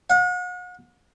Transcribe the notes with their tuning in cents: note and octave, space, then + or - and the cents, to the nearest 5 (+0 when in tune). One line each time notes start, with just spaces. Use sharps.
F#5 -40